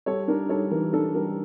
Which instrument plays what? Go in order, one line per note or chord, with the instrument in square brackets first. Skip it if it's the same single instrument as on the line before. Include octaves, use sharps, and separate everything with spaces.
[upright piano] G3 A4 C#5
D4 A#4
G3 A4 C#5
E3 A#4
D4 A4
G3 A#4